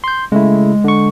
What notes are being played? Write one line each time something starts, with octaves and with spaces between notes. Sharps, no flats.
C6 G6
C#3 G#3 A3 E4
D3 C#6